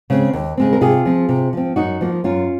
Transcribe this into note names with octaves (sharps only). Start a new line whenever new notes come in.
C#3 G#3 C4
D#2
C#3 G#3 C4
A#4
C3 F4 G#4
F3 C4
C3
F3 C4
F#2 D#4 F#4
F3 A#3
F#2 C#4 F4